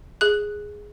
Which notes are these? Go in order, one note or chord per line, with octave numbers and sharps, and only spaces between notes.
G#4 F#6